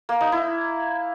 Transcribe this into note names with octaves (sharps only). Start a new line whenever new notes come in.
A#3
D#4
E4